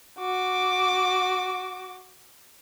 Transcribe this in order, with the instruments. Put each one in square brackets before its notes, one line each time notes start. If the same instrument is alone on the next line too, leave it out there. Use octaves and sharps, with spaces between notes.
[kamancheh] F#4 D6